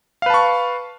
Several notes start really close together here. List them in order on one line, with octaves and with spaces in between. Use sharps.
F5 B4 A5 C#6